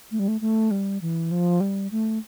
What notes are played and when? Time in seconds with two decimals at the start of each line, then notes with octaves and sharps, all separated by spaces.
0.12 A3
0.19 G3
0.28 A3
0.41 A3
0.71 G3
1.01 E3
1.31 F3
1.61 G3
1.91 A3